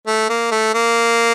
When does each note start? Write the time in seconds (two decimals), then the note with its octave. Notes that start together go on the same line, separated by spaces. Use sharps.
0.07 A3
0.29 A#3
0.51 A3
0.74 A#3